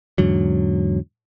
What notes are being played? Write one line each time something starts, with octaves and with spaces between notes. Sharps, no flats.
E2 G#2 D3 F#3